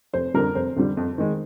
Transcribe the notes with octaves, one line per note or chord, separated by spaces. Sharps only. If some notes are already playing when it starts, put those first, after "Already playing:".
F1 C5
F2 D3 G3 A#4
F1 C5
F2 D3 G3
F2
D#3 G#3